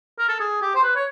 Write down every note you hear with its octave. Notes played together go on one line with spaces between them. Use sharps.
A#4
A4
G#4
G4
C5
B4
C#5